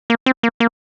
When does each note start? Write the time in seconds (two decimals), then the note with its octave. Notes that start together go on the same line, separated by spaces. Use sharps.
0.10 A#3
0.26 C4
0.43 A#3
0.60 A#3